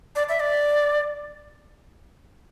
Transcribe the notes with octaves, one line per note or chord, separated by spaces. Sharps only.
D5
E5
D5